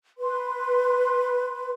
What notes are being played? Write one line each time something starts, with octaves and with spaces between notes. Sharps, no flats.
B4 C6